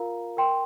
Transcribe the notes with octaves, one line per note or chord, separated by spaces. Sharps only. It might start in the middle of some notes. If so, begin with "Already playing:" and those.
Already playing: F4 A#4 F5 A#5
A#4 G5 C6